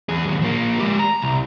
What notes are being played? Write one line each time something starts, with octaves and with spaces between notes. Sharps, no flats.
E2 G#4
D#2 F#3
F3 A#3
G#3 G4
A#5
C2